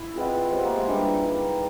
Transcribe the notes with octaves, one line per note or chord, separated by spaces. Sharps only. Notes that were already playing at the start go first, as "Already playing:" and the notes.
Already playing: E4
C4 F4 G#4 B4 D#5 F#5
B3 G4 C5 D#5 F#5
A#3
G#3
G3 D4 F4 G#4 B4 E5
D#4 G#4 B4